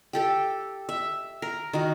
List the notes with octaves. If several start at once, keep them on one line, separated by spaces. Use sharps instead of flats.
G4 A4 G5
E5
A#4
D#3 F#4